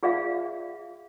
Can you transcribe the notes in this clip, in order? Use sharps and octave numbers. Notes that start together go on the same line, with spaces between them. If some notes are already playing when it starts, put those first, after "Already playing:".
F4 G#4 D5 E5 F5